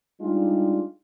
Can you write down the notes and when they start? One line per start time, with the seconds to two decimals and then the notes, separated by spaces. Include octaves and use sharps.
0.21 G3 G#3 D4 D#4 F4